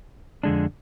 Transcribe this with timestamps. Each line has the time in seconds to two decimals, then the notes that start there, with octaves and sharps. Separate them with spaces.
0.43 F2 D3 G#3 D4